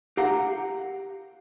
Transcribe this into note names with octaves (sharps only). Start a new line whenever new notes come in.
G4 F5 F#5 A#5